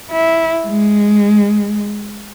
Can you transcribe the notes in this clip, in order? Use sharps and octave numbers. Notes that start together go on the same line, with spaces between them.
E4
G#3